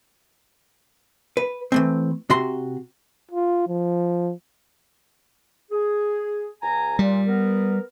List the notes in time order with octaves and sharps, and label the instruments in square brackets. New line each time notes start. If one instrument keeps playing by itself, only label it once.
[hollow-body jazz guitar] B4
E3 A3 C4
C3 F#4 C6
[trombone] F4
F3
[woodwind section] G#4
C#2 G#5 A#5
[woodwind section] A#2 [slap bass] G3
[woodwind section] B3 A#4